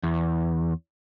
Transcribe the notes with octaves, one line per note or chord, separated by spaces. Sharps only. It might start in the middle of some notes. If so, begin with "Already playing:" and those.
E2